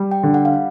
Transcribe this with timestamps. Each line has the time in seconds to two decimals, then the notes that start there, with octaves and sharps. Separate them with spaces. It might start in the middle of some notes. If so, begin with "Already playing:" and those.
Already playing: G3
0.11 G5
0.23 D3
0.34 F#5
0.45 F5